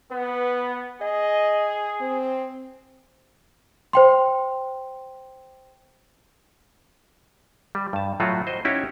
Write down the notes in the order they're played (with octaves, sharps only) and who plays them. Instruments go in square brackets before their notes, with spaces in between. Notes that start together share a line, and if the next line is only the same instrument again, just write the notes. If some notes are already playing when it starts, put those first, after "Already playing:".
[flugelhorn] B3 [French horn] B4
[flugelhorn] G#4 [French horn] D#5
[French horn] C4
[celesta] C5 G5 C6
[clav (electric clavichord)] G3
G2 A5
A2 F#3 A3 F4 F#4
C5 D#5
C#4 D#4 E4 F#4 G4 C#5